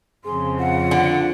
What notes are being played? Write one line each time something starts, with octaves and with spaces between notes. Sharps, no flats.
F2 C#3 C4 G#4 C6
F4 F#5
D3